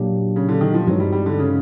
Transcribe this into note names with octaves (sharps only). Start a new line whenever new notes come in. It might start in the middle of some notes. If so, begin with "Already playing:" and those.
Already playing: A#2 F#3 A#3 D4 G4
C#3
D3
D#3
F3
G2 E3 F#3 G#3 C4 D#4
G3
G3
D3
C#3